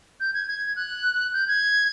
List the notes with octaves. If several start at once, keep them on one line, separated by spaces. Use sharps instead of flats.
G6
G#6
G#6
F#6
G6
G#6